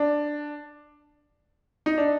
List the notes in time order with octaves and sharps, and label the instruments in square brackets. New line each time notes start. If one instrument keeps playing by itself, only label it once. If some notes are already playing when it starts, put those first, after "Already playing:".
Already playing: [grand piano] D4
D#4
D4